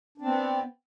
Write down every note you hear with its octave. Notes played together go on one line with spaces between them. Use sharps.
B3 C4 D4